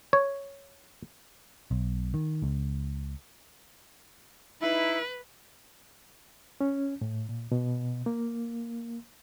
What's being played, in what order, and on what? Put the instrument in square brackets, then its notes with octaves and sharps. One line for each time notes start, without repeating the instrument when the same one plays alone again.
[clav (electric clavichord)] C#5
[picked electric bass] B1
D#3
C#2
[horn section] D#4 E4 [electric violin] B4
[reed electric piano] C#4
A2
A#2
B2
A#3